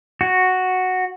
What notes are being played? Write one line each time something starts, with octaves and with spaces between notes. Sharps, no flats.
F#4